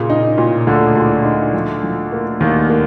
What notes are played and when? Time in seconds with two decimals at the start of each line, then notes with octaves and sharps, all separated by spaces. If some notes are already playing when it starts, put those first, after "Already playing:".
Already playing: A#2 C#3
0.10 D#4
0.38 A#2
0.67 D2 A#2 D3
0.96 A#2
1.25 D#4
1.53 F3
1.83 F3
2.12 A#3
2.40 D#2 D#3 A#3
2.70 A#3